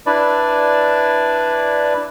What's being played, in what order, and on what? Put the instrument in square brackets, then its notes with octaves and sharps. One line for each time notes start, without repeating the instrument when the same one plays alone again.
[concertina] D4 E4 B4 D5